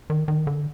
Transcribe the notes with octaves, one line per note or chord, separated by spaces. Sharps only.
D#3
D#3
D3